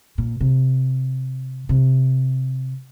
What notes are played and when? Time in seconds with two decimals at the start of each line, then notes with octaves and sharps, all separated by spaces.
0.18 A#2
0.40 C3
1.69 C3